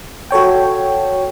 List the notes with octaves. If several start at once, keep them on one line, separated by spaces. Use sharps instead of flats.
F#4 A4 C#5 G5